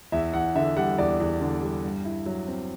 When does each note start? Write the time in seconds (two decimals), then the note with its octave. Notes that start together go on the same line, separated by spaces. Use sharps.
0.12 E2 E5
0.34 E2 F#5
0.55 D3 E5
0.77 G3 F#5
0.98 E2 D5
1.20 E2
1.41 D3
1.62 G3
1.84 G2
2.05 E4
2.26 F#3
2.48 C4